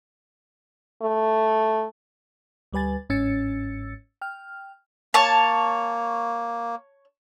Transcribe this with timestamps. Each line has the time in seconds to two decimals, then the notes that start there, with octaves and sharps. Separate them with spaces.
1.02 A3
2.73 D2 G3 B4 G#5 A6
3.09 G1 G#2 C#4 E6 A6 C#7
4.21 G5 F6
5.14 A#3 C#5 A5